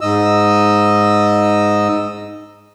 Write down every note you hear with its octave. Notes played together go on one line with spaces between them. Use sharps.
G#2 D#5 E6